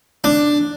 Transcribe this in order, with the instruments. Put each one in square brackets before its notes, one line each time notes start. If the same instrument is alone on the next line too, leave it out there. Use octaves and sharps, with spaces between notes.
[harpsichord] D4